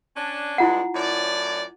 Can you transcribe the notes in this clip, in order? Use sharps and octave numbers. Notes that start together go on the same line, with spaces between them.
C#4 D4
G2 G#3 D4 E4 F4 F#5
F#2 A2 D5